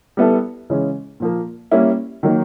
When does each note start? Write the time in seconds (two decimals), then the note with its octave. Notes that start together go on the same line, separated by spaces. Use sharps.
0.17 G3 B3 E4 A4
0.70 C#3 E3 G#3 C#4
1.20 A#2 F3 A#3
1.71 G3 A#3 C#4 E4
2.23 D#3 F#3 A#3